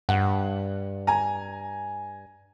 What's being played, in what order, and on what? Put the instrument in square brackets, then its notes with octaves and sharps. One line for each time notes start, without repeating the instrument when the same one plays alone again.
[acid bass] G2 [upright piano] F#5
[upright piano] G#5 A#5